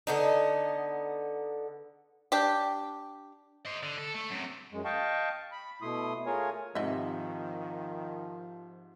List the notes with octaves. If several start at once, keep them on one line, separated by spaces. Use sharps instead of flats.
D3 B3 D#4
D4 G4
C5 D#5
D3
A4
A3
F#2 C3
F#2 G#3
D#5 F5 G5 A5 C#6
B5
B2 A3 E4 C6 D#6
A3 F4 G#4 A#4 C#5 G#5
G#2 C3 D#3 F3 D#5 E5